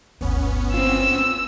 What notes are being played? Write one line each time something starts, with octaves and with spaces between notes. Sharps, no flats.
G1 D2 B3 C#4
C4 F4 E6